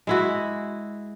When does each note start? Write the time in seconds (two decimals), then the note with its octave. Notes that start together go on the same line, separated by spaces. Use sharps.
0.07 G#3 E4 F#4